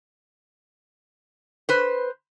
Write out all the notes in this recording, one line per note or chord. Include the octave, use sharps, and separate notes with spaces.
B4 C5